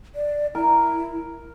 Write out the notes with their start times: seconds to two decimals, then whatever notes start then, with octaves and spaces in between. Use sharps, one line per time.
0.15 D5
0.55 E4 A#4